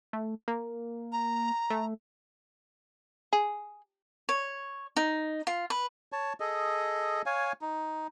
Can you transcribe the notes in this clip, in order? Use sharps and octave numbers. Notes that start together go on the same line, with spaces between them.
A3
A#3
A#5
A3
G#4
C#5
D#4
F4
B4
C#5 A5
G#4 A4 D#5
C#5 F5 G#5
D#4